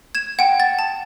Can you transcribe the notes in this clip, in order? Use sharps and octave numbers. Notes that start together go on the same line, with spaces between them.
G#6 E7
F#5 G5
A6
A5